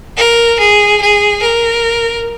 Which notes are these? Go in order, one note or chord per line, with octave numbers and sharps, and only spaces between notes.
A#4
G#4
G#4
A#4